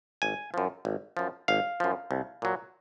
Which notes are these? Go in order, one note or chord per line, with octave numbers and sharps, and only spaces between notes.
G#1 G#5
F#2 F3
G#1
F#2 F3
G#1 F5
F#2 F3
C2
A#2 F#3